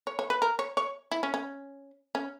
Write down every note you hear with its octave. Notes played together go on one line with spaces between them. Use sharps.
C#5
C#5
B4
A#4
C#5
C#5
E4
C#4
C#4
C#4